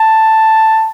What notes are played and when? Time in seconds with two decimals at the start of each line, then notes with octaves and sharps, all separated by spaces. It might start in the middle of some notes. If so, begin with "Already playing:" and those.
Already playing: A5